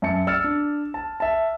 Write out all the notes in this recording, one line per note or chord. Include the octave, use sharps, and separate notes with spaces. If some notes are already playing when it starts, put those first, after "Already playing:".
F#2 E5 A5 C#7
D5 E6 F6 A6 C#7
D4
A5
E5 A5